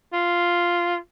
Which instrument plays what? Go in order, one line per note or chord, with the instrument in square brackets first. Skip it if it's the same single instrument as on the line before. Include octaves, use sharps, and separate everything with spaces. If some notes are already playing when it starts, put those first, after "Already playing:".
[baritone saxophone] F4